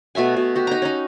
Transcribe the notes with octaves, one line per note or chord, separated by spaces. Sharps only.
B2 A3 E5 G#5
B2
F#4 G4
D#4 A#5
C#4 D#4